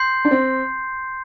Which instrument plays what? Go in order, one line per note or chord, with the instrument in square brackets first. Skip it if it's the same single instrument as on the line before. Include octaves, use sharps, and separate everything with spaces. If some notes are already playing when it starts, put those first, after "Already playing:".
Already playing: [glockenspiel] C6 G6 C7
[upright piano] D4
C4